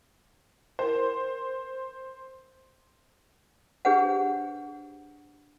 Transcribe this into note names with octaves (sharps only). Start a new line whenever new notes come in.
E4 A#4 C5 G5
D4 G4 G#4 B4 C5 F#5